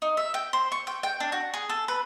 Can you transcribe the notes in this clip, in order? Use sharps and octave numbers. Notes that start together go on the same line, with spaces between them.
D#4
E5
G5
C5
C#6
G5
G5
D4
F#4
G#4
A4
B4